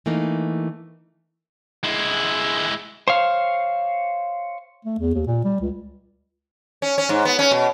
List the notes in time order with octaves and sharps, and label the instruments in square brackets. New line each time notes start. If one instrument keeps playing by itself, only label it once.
[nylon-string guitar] E3 A3 A#3 D#4
[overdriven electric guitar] G#3 E4
[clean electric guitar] C5 C#5 F5
[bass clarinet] A3
E2
D#2
A#2
G3
C#2
[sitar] C#4
C#4
G#2
B3
C#4
B2